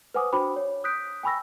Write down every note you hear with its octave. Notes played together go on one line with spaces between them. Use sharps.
B4 C5 F#5 G#5 D6 D#6
D4 F#4 C5 G5 B5 D6
C#5
D#6 F#6 G6 B6 D7
G5 G#5 B5 C#6 E6 A#6